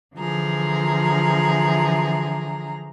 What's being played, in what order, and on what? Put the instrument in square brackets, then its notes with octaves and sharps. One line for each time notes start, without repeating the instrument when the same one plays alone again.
[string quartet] D3 E3 F3 G#4 A#5